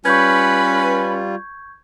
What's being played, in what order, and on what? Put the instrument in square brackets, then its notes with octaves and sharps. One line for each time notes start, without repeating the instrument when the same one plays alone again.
[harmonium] G3 F4 [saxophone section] C#4 B4 [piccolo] B5 [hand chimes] C#6 G6 G#6